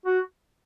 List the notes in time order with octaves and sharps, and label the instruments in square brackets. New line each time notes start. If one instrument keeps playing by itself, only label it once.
[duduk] F#4